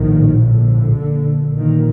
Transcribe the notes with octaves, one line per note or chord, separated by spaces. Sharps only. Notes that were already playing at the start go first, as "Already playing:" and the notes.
Already playing: A#1 A2 D#3
D3
A#1 A#2
D#3